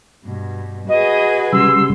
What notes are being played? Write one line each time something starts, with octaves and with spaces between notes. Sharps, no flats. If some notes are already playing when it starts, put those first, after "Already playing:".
G2 B2
F#4 G#4 B4 D#5
C#3 G3 C6 E6